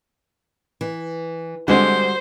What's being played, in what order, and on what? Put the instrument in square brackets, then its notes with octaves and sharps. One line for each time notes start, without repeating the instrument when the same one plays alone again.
[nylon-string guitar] E3
[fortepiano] D3 G#3 C4 [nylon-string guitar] G3 F#4 [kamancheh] C5